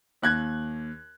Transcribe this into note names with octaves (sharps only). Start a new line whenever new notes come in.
D#2 F#6 G#6